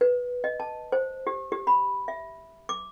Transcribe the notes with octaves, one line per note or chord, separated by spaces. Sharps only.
B4
D#5
A5
C5
G4
G4
B5
E5
D6